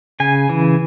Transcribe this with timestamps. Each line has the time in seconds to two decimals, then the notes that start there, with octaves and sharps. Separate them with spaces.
0.20 C#3 G#5
0.49 E3